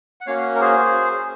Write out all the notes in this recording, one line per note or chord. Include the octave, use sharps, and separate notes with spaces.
F#5
A#3 C#4 F#4 C#5 F5
A#4
G#4 C5